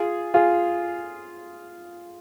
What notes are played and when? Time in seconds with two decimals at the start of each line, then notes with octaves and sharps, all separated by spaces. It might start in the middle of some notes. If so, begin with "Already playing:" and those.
Already playing: F4 G#4
0.34 F4 G#4